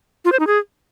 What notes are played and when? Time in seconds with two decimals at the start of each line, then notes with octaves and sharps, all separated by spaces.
0.25 F4
0.32 C5
0.40 D#4
0.47 G#4